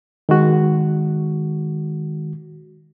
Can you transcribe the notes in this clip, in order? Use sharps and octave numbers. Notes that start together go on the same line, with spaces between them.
D#3 G#3 F#4